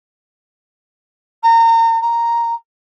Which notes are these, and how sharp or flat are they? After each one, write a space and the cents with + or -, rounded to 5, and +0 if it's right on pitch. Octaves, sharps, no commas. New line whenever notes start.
A#5 -30
A#5 +0